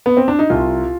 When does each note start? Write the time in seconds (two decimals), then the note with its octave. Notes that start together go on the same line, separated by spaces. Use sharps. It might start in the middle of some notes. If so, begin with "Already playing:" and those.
0.06 B3
0.17 C4
0.28 D4
0.39 D#4
0.50 C2 F4